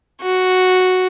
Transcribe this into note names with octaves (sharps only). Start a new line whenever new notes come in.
F#4